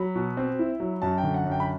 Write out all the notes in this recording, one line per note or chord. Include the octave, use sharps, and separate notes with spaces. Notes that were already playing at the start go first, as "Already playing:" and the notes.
Already playing: F#3 B5
B2
C4
E4
F#3
F#2 A5
G5
D3
F#5
F#2
G5
B5